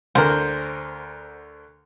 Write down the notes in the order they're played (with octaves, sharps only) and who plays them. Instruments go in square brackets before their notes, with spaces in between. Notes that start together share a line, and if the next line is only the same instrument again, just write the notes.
[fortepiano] D2 D3 A#4 [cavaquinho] C5